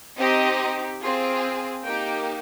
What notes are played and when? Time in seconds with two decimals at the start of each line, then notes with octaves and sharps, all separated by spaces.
0.18 C4 D#4 G4 D#5
1.01 C4 F4 G#4
1.82 A#3 D#4 G4 G5